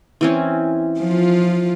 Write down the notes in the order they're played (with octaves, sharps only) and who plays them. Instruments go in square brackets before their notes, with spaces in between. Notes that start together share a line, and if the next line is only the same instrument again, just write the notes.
[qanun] E3 C4 C#4
[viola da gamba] F3 F4